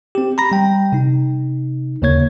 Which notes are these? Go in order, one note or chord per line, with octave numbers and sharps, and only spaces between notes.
C4 G4
A#5 B5 A#6
G3 G5
C3 D#4
D#2 C#3 A#3 C#5 G#6